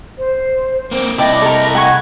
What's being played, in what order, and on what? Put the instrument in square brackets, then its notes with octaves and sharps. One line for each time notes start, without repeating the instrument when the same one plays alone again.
[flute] C5
[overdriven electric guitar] A#3 C4
[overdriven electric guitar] C3 E4 [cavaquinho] D5 G5 A5 [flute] D#5
[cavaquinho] A4 A#4
F#5 G#5 C#6